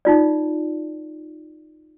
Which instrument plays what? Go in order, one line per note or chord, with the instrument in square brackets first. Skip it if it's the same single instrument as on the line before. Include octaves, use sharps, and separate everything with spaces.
[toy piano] D#4 F4 D5